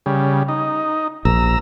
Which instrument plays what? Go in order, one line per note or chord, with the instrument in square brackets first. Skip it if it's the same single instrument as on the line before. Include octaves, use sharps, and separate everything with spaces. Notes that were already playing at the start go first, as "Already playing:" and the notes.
[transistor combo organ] C#3 G3
D#4
[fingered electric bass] A#1 [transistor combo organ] A#5 E6